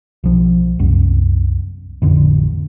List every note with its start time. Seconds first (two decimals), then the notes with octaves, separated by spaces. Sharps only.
0.24 B1 F3
0.79 C2 F#2
2.02 A1 F2 D3